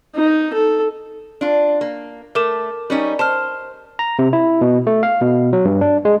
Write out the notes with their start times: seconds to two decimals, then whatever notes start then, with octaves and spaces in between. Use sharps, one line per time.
0.16 D#4
0.53 A4
1.41 D4 F4
1.81 A#3
2.35 A3 A#4 D6 E7
2.90 G3 C#4 D#4
3.19 C5 A5 F6
3.99 A#5
4.19 C3
4.33 E4
4.61 B2
4.87 A3
5.03 F5
5.21 B2
5.53 F#3
5.65 G2
5.81 D4
6.05 G#3